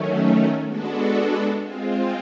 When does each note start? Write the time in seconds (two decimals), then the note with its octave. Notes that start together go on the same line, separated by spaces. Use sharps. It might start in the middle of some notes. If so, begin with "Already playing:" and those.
Already playing: D#3 F#3 A3 C#4
0.65 G#3 B3 D4 F#4 A4
1.61 G#3 C4 F4